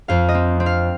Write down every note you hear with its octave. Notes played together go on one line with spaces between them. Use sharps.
F2 F5
D#5
C4
C4
F5